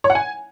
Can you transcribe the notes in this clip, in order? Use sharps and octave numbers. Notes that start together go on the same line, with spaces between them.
C#5
F#5
G#5